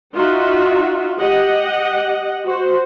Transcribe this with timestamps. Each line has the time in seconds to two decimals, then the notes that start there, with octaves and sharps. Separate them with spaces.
0.14 D#4 F4 F#4 E5
1.18 G4 D#5 F#5
2.45 F#4 C5